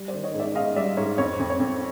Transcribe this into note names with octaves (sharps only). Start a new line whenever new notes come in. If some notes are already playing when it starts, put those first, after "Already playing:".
Already playing: G3
C5 D5
D#3
C#5 D#5
G#2
D5 E5
G#2 D#5 F5
G3 D5 E5
G#2 C#5
F2 C#5
F2
C#5
F2